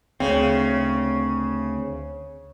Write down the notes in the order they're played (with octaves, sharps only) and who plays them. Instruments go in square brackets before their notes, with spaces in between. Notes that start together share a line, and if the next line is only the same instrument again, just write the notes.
[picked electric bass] D2 C4 [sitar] C#3